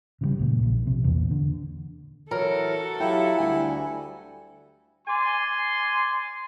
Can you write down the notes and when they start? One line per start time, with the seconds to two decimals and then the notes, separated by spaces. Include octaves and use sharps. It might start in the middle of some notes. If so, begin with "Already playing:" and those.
0.21 C#3 E3 G3
0.39 C#2 A#2
0.63 A#1 F3
0.87 C3
1.04 E2 A#2
1.31 D3
2.31 E3 F#3 F#4 A4 A#4
3.00 F#3 E4 F4 G4 G5
3.39 D2 G3 G#5
5.07 D5 G#5 C6